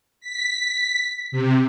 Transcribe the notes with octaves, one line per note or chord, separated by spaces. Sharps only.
B6
C3